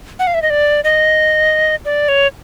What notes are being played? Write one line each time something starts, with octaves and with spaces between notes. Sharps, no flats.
F#5
F5
E5
D#5
D5
D#5
D5
C#5